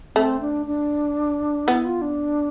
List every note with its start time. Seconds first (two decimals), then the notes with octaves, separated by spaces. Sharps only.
0.16 A3 C4
0.41 D4
0.66 D4
1.67 B3 E4
1.85 F4
2.02 D4